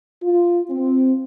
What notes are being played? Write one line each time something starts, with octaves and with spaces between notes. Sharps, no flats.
F4
C4